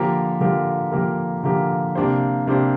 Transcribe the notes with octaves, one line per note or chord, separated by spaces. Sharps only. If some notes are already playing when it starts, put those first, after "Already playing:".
Already playing: D3 F3 A#3 G4 A#4
D3 F3 A#3 G4 A#4
D3 F3 A#3 G4 A#4
D3 F3 A#3 G4 A#4
C3 A#3 D4 G4 C5
C3 A#3 D4 G4 C5